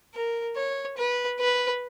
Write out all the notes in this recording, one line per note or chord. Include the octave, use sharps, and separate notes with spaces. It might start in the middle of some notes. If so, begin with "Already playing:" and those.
A#4
C#5
B4
B4